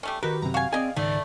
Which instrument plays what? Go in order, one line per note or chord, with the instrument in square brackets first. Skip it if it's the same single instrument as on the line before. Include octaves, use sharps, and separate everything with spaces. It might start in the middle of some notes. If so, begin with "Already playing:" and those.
[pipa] G3 A3 C#4
[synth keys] D#3 F#4 G4 [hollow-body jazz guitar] A#4 [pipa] B4
[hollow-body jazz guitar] F#2 C3 [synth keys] A#5
[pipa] F#4 G#5 [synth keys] F5
[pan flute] C4 [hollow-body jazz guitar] G#4 B4 D5 [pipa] D#5 G#5
[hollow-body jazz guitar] C#2 G#2 D#3 [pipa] A3 [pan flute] D5